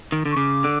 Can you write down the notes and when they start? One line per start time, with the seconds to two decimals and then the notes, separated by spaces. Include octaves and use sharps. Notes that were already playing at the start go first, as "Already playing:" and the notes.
0.12 D#3
0.25 D3
0.32 C#6
0.37 C#3 D6
0.64 D3